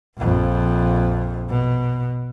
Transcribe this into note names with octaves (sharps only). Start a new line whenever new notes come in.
A#1 F2
B2